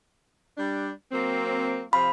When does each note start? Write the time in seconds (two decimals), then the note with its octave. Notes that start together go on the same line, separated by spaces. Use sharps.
0.58 G3 D4
1.12 F#3 A#3 C4
1.93 C3 F3 F4 B5